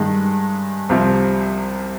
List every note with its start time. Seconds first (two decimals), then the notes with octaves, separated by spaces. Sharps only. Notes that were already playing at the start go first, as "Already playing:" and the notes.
Already playing: G2 D#3 G#3 D#4
0.89 C2 C3 F3